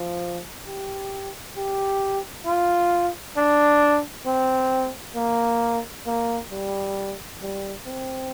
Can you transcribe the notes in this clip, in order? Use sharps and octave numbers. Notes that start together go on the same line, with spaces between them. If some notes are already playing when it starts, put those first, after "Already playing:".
Already playing: F3
G4
G4
F4
D4
C4
A#3
A#3
G3
G3
C4